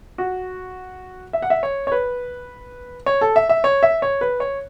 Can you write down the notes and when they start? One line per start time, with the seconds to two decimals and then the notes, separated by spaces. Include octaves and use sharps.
0.18 F#4
1.33 E5
1.42 F#5
1.50 E5
1.63 C#5
1.87 C#5
1.92 B4
3.06 C#5
3.21 A4
3.36 E5
3.49 E5
3.64 C#5
3.83 E5
4.02 C#5
4.21 B4
4.40 C#5